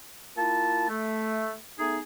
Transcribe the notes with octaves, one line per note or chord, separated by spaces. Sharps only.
A#3 E4 F4 A5
A3
A3 B3 D#4 G#4